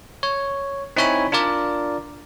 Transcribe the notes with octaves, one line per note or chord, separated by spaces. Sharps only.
C#5
C4 D#4 E4 C#5 G#5 B5
D4 F4 A#4 D5